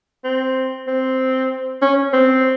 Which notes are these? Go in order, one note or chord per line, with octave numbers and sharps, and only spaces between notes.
C4
C4
C#4
C4